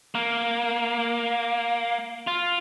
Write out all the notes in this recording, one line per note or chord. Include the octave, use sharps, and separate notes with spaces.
A#3
F4